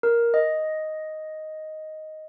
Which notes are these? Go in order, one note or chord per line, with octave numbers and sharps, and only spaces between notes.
A#4
D#5